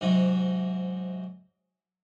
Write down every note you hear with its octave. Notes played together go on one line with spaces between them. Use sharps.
G#2 C3 F#3